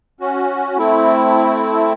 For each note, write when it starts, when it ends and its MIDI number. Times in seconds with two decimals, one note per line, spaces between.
0.21 0.78 61
0.21 0.78 66
0.78 1.93 57
0.78 1.93 60
0.78 1.93 64